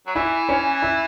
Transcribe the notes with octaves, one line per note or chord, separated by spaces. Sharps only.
F#3
E3 E4 E5
C#4 C#5
E4 E5